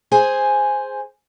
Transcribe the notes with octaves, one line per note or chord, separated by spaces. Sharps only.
G#4 C5 G#5